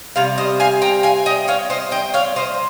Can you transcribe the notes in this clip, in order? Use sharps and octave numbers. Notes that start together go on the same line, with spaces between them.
C3 G3 F5
C5 D#5
F5 G#5
G5 A#5
F5 G#5
D#5 G5
C#5 F5
C5 D#5
D#5 G5
C#5 F5
C5 D#5